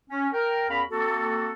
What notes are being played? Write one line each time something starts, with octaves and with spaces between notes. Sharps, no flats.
C#4
A#4 G5
E2 C#4 A#4 F5 B5
A#3 C4 F#4 A4